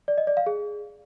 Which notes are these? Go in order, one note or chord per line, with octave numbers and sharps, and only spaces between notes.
D5
D#5
D5
F5
G#4